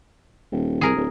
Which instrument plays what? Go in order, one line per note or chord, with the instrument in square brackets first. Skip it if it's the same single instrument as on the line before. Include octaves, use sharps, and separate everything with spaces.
[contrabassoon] D#1
[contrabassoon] C2 [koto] G#4 A#4
[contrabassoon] D1